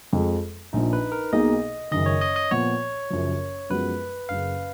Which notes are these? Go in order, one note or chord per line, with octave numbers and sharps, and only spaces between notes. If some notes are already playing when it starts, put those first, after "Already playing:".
F2 F3 G#3
A#1 A#2 F3 D#4
B4
A#4
B1 B2 A#3 D#4 G#4 D#5
F#1 F#2 D#3 D#5
C#5
D#5
D#5
A#2 F3 B3 C#5
F#1 F#2 F3
F#2 F3 G#3 B3 F#4 B4
F#1 F#2 C#3 F5